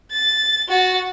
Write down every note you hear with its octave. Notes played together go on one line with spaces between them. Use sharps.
A6
F#4 A6